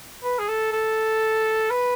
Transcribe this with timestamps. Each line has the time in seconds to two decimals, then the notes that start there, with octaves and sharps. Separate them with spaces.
0.24 B4
0.39 G#4
0.49 A4
0.73 A4
1.70 B4